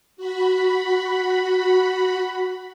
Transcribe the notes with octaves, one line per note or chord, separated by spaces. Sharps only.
F#4 B5